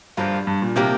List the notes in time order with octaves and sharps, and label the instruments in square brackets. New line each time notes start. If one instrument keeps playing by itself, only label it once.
[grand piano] G2 [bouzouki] D3 F3 A#3 F4
[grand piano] G2
A#2
[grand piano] C3 [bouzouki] D#3 A#3 D4 G4